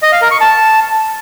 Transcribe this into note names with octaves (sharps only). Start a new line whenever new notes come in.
D#5
F5
A#4
C#6
A5